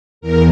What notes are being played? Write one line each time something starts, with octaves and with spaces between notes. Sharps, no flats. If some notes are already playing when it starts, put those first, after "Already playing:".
E2 A#4